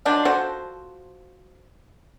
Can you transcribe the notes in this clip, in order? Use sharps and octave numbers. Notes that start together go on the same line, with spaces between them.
D#3 F3 F#3 D4
F3 F#4 A4 C5